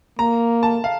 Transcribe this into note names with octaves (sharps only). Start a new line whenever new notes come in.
A#3 A#5
A5
F5